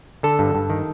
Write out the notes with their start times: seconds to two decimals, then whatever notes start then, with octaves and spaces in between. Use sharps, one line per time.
0.23 D3 A4
0.39 G2
0.55 G2
0.70 D#3